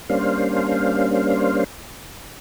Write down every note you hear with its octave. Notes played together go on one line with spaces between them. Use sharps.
G3 A#3 C#4 D4 C5 F5